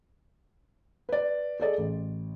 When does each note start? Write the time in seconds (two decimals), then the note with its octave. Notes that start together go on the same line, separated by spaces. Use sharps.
1.09 B4 D5
1.60 G#4 A4 D5 D#5
1.78 A1